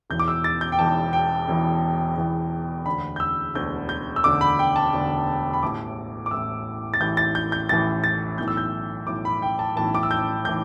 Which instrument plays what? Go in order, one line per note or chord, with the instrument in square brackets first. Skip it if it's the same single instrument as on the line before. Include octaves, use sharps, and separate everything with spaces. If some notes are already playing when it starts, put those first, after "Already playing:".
[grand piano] E1 E2 E3 G6
D6
E6
A6
G6
G5
E1 E2 E3 A5
G5
E1 E2 E3
E1 E2 E3
E1 D2 D3 B5
G6
E6
E1 D2 D3 G6
G6
E6
E1 D2 D3 D6
B5
G5
A5
E1 D2 D3
B5
A1 A2 E3 D6
D6
A1 A2 E3 E6
A6
A1 A2 E3 G6
A6
G6
G6
A1 A2 E3 A6
A6
B1 A2 E3 G6
E6
G6
B1 A2 E3 D6
B5
G5
A5
B1 A2 E3 A5
D6
E6
G6
A2 E3 G6